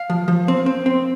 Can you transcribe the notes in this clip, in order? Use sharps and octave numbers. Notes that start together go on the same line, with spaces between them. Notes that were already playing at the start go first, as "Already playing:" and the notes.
Already playing: F5
F3
F3
C4
C4
C4